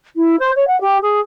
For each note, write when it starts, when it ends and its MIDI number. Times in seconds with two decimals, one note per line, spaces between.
0.16 0.35 64
0.39 0.50 72
0.55 0.67 73
0.67 0.78 78
0.80 0.97 67
1.02 1.20 68